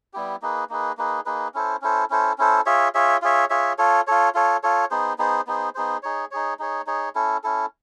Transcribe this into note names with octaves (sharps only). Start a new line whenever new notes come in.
G3 B3 E4 G4
A#3 D#4 G#4 B4
A#3 D#4 G#4 B4
A#3 D#4 G#4 B4
A#3 D#4 G#4 B4
C#4 E4 A4 C5
C#4 E4 A4 C5
C#4 E4 A4 C5
C#4 E4 A4 C5
F4 G#4 C#5 E5
F4 G#4 C#5 E5
F4 G#4 C#5 E5
F4 G#4 C#5 E5
F4 A4 C#5
F4 A4 C#5
F4 A4 C#5
F4 A4 C#5
B3 D#4 G#4 C5
B3 D#4 G#4 C5
B3 D#4 G#4 C5
B3 D#4 G#4 C5
D#4 G#4 C#5
D#4 G#4 C#5
D#4 G#4 C#5
D#4 G#4 C#5
C#4 E4 A4
C#4 E4 A4